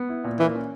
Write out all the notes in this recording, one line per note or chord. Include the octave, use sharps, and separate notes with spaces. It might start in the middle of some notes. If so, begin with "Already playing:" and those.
Already playing: B3
E4
A#2
E3 A#3
C#4